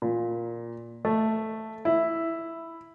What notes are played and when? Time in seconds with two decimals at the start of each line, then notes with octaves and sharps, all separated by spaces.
0.02 A#2
1.05 A3
1.85 E4